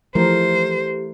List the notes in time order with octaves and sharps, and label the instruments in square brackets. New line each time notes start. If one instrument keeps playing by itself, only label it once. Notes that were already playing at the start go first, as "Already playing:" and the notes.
[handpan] E3 A3 A#4 [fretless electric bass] F3 [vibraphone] G4 [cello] C5